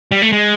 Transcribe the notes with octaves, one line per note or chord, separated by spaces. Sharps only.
G3
A3
G#3